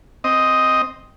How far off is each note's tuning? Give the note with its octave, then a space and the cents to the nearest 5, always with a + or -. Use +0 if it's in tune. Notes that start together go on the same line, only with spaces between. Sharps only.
C4 +0 D#5 +5